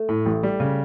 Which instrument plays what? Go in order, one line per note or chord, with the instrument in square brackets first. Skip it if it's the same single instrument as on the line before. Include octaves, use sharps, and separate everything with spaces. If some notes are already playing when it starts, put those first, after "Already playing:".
Already playing: [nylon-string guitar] A3
[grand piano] A2
A1
G3
C#3